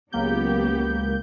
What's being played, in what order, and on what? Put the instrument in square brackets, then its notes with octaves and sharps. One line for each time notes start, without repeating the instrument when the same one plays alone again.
[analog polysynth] C#2 A#3 G6 [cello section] F#3 B3 G4